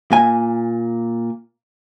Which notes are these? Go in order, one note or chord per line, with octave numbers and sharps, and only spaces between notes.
A#2 G#5